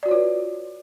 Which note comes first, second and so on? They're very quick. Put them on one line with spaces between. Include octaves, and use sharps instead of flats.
D5 F#4 C#5 F4 B4